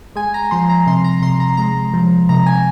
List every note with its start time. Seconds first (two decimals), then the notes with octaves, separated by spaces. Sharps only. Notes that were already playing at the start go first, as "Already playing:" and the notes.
0.16 G#3 G#5
0.34 A#5
0.51 F3 C6
0.70 A#5
0.87 C3 C6
1.04 A#5
1.22 C3 C6
1.40 A#5
1.57 G#3 A#5
1.94 F3
2.29 C3 A#5
2.46 G#5